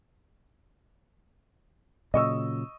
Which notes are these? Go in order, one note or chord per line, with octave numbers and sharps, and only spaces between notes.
A#2 C#3 F#3 D#5 C#6 E6